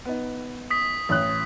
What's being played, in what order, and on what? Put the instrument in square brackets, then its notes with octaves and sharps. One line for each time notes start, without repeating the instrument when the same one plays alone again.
[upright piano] B3 D#4
[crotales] D#6 B6
[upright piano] A1 F#6